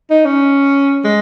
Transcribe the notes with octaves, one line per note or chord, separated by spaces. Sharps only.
D#4
C#4
G#3